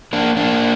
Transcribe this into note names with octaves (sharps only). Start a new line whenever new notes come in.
A#3 D4
A#3 D4